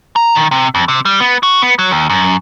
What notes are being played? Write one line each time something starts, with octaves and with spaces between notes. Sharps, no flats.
A#5
D#3
C3
F2
C3
G3
B3
F#4
B3
F#3
D#2
F#2